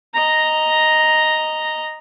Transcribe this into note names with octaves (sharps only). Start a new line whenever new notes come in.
D#5 A#5